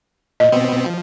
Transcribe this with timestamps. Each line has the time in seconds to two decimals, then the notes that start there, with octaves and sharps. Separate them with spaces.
0.40 A#2 D#5
0.52 B2 B3 C4
0.86 F3